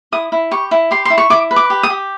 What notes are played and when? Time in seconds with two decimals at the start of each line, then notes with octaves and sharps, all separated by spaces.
0.12 E4 D#6
0.32 E4
0.51 G4 C#6
0.71 E4
0.91 G4 C6
1.05 E4 C6
1.18 C#6
1.30 E4 D6
1.51 B4
1.56 D6
1.70 G4
1.83 D#6
1.90 G4